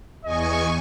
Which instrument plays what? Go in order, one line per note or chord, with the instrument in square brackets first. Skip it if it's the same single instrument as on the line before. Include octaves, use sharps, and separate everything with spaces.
[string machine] E2 G#5 C#6 [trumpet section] D#5